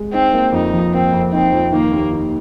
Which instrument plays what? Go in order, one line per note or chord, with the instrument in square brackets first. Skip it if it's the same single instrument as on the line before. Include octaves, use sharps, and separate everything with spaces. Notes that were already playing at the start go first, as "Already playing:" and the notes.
Already playing: [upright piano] G#3
[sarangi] C4 [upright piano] D#4
[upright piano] A#3
[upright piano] F2 [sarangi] D#4
[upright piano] F3
[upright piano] A#3 [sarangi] C4
[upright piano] F2
[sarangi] C4 [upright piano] D#4
[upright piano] F2
[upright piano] D#3 [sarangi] A#3
[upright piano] D#2
D#3